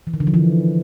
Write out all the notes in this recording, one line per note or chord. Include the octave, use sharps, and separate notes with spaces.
E3
D#3
D3
F3
E3